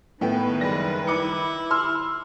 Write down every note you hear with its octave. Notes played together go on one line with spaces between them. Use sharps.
A2 D#3 B3 B4 G5
F#1 G3 A#6
E4 D6 C#7
C6 E6 F6